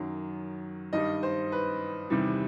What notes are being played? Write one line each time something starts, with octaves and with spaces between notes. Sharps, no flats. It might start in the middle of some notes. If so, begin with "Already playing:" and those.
Already playing: F#2 D#3 F#3
G2 D#3 G3 D#5
C5
B4
E2 C3 D#3 G3